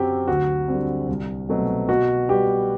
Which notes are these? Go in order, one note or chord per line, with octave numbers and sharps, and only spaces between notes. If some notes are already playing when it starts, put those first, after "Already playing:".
Already playing: F#2 F#3 C4 G4
D2 F#4
D3 G3 C4
C2
B2 F#3 A3 C4
B2 F#4
G3 B3 G4